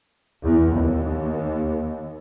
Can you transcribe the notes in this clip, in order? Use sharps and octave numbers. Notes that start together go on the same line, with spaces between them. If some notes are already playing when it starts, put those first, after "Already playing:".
E2
D#2